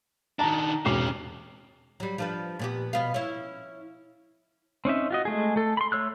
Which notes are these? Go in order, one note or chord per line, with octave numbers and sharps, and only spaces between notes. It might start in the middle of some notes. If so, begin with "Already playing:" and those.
D#3 D4 A5 A#5
E1 C3 C#4 D6 C7
F#3 G3
F3 D4 B4
A#2 B3 G4
B2 B3 F5
C#4 E4
C4 C#4 D#4 E5
F4 F#4 D#5
G#3 A3 G#4
A3 A4
B5 C6
A3 C#5 E6 F#6